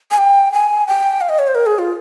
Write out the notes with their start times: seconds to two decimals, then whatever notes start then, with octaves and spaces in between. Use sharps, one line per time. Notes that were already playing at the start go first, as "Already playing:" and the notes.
0.11 G#5
0.18 G5
0.52 G#5
0.87 G5
1.21 F5
1.29 D#5
1.39 C#5
1.47 C5
1.55 A#4
1.66 G#4
1.78 F4